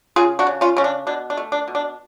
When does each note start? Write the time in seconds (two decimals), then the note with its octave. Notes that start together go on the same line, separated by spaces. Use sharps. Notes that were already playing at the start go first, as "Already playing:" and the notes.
0.16 C#3 F4 G#4
0.39 D4 F#4
0.47 C#3
0.61 C#4 F4
0.77 C#3 C#4
0.84 D4
1.07 B2 D4
1.30 D4
1.37 A3
1.52 D4
1.68 B2
1.75 D4